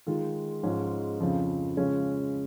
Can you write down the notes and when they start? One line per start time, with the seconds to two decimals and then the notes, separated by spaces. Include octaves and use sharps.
0.07 D#3 G#3 F4
0.63 G#2 F3 G#3 C#4
1.20 F2 C#3 F3
1.77 C#3 F3 G#3 C#4